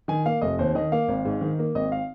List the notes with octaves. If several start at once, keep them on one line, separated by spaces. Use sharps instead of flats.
D#3 G#5
A#3 F5
F1 D#5
D#2 C5
D#3 D#5
A#3 F5
G#1
G#2
D#3
A#3
G#1 D#5
F5